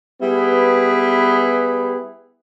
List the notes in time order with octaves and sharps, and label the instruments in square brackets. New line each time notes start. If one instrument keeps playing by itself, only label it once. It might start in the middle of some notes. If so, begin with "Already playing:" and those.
[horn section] G3 B3 E4 G4 G#4 B4